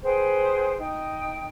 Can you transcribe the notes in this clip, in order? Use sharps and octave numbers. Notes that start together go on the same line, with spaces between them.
G#4 B4 C5 G5
D#4 G5